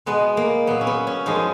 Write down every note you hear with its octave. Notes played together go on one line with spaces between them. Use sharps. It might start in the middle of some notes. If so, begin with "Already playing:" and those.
B2 G#3 B3
A#3
A#2 F#3 B3
C#4
B3
C#4
F#2 F3 G#3 D#4